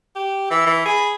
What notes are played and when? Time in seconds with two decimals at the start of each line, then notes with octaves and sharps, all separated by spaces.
0.16 G4
0.50 E3 E6
0.66 E3
0.85 G#4 B5